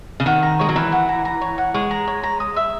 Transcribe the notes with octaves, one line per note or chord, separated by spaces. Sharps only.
C#3
D#3 F#5
A#5
G#3 C#5
F#3
E3 A#4
F#5
A#5
A#5
C#5
F#5
G#3 C#5
A#5
C#5
A#5
D#6
E5